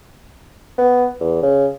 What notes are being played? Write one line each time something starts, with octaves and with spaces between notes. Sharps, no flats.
B3
E2
C#3